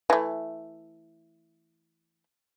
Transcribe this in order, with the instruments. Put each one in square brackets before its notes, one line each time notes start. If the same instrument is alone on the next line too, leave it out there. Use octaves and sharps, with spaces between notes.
[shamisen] E3 A3